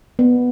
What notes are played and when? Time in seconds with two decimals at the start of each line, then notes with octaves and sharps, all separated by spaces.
0.19 B3